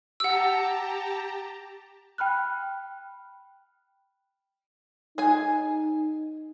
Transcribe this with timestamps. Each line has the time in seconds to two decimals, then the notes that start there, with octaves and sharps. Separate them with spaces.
0.20 G4 F#5 A5 A#5 E6
2.18 G5 B5 F6 F#6
5.18 D#4 G#4 G#5